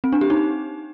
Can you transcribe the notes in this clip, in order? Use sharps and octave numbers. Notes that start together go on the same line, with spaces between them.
C4
D4
G4
D#4